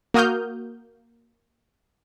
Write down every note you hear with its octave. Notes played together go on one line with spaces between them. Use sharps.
A#3 F#4 D#6 F6 G6